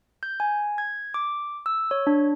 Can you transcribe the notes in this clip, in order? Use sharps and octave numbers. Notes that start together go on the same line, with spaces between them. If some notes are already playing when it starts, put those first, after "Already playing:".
G6
G#5
G#6
D6
E6
C#5
D4